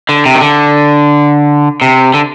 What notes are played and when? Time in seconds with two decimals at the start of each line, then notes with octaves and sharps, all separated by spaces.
0.09 D3
0.26 C3
0.35 D#3
0.41 D3
1.82 C3
2.14 D3